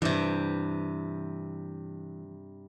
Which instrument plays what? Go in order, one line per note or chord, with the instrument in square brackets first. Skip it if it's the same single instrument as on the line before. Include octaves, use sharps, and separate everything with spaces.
[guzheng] G2 C3 [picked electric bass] E3